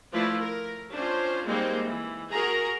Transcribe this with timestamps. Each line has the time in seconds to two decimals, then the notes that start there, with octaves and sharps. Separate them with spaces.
0.13 F3 A3 E4 F4 B4 D5
0.42 A#4
0.93 C#4 D4 F4 C5
1.45 G3 G#3 A#3 C4 D#4 C5
1.83 E3
2.31 F#4 G#4 A#4 A#5